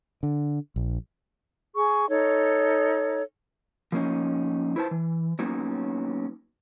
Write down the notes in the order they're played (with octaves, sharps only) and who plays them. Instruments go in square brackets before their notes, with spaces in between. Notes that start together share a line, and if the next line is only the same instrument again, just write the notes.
[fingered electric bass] D3
A#1
[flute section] G#4 C#6
D#4 A4 C#5
[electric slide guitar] F3 A#3 C#4 D#4
E4 B4 C5 A5
E3
F#3 A#3 B3 C#4 D#4